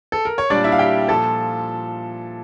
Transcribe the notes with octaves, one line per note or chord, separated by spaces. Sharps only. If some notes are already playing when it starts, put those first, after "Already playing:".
A4
A#4
C#5
A#2 G3 D4 D5
E4 E5
F5
G4 G5
A#2 F3 A4 A5